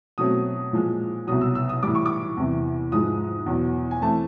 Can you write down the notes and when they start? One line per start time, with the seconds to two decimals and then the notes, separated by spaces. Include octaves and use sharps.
0.18 B2 F#3 A3 C4 D#6
0.73 A#2 F3 G#3
1.27 C2 B2 F#3 D#6
1.41 E6
1.55 E6
1.69 D#6
1.83 A2 E3 G3 D6
1.95 C#6
2.06 D6
2.37 E2 C3 E3
2.92 G#2 F3 G#3 D#6
3.46 E2 B2 F#3
3.91 G#5
4.01 E3 A3 C4 A5